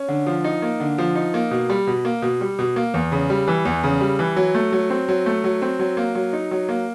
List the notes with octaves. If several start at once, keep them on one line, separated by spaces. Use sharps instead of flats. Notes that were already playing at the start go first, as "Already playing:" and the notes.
Already playing: C#4
D3
F3
D#4
A#3
D3
F3
D#4
A#3
B2
G3
B2
A#3
B2
G3
B2
A#3
E2
C#3
G3
E3
E2
C#3
G3
E3
F#3
A3
F#3
C4
F#3
A3
F#3
C4
F#3
A#3
F#3
D#4
F#3
A#3